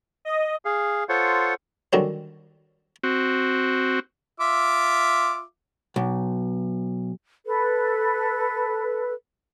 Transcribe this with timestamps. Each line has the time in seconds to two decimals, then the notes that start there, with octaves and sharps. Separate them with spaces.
0.25 D#5
0.65 G#4 F5
1.09 F4 A4 C5 C#5 F#5
1.93 D3 D#3 F#3 G3 C4 C#4
3.03 C4 F#4
4.40 F4 E5 D6
5.96 B1
7.46 A4 B4